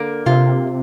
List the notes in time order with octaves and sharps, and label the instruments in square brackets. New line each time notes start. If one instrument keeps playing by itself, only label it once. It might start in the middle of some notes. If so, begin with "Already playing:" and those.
Already playing: [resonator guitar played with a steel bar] D3 A#3
[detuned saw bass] C3 [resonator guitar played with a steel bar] F4